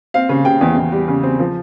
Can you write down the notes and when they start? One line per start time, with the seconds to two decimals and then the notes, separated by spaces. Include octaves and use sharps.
0.14 C4 F5
0.29 C#3
0.45 C#3 G5
0.61 E2
0.77 E2
0.92 G3
1.08 C#3
1.23 C4
1.39 F3